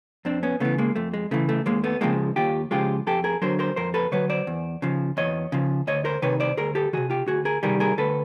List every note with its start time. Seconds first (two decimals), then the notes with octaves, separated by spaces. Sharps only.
0.25 F2 C4 D4
0.43 B3 C#4
0.60 C#3 E3 A3 B3
0.78 G#3 A#3
0.96 F2 A3
1.14 G#3
1.31 C#3 E3 A3
1.49 A3
1.66 D#2 G#3 A#3
1.84 A3 B3
2.01 C#3 F3 G#3 A#3 C4
2.36 D#2 F4 G4
2.71 C#3 F3 G#3 F4 G4
3.07 F2 G4 A4
3.24 G#4 A#4
3.42 D3 F#3 A#4 C5
3.59 A#4 C5
3.76 F2 A#4 C5
3.94 A4 B4
4.12 D3 F#3 B4 C#5
4.30 C5 D5
4.47 E2
4.82 C#3 F3
5.17 E2 C#5 D#5
5.52 C#3 F3
5.87 D2 C#5 D#5
6.05 A#4 C5
6.22 C3 D#3 B4 C#5
6.40 C5 D5
6.57 D2 G#4 A#4
6.75 G4 A4
6.93 C3 D#3 F#4 G#4
7.10 F4 G4
7.28 D2 F#4 G#4
7.45 G#4 A#4
7.63 C3 D#3 G3 G#4 A#4
7.80 G#4 A#4
7.98 D2 A4 B4